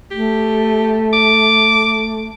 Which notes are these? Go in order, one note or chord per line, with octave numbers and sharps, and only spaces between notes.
A3 G4
D6